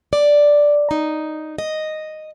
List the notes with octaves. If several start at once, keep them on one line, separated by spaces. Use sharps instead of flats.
D5
D#4
D#5